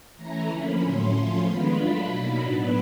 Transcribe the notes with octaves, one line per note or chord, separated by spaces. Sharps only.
E3 A3 C#4 E4 A#5
D3 F3 A#3 C#4 B5
A2 F#3 A3 C#4 C6
F3 A3 C#4 F4 C6
D#3 G#3 B3 D4 F4 B5
F#3 A3 D4 F4
B2 F#3 A#3 D#4
A2 F#3 B3 D4 B5